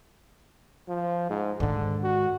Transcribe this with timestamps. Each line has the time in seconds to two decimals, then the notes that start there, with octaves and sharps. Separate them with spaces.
0.88 F3
1.30 G#2
1.60 G#2 D3 D#3
2.03 F#4